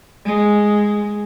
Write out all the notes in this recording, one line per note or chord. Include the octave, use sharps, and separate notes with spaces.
G#3